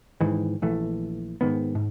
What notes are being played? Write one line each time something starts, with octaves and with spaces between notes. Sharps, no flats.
G#2 D#3 E3
A#1 E3 A3
G#2 D#3 B3
G#2